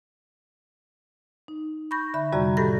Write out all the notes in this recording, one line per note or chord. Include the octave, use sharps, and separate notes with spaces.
D#4
B5 C#6 G6 A#6
D3 E5 B5
F2 C3 G3 F#4 D5 A#5
A2 D#3 G4 A4 B5 A#6